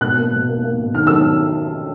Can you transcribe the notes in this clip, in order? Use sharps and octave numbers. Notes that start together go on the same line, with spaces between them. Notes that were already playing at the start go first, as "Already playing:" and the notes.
B2 F#6
A#3
B2
A#3
A#3
B2
D#3 F6
F#3 E6